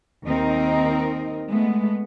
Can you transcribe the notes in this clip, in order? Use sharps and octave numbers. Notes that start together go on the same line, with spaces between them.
D#2 C4 D#4 A#4
G#3 A3 B3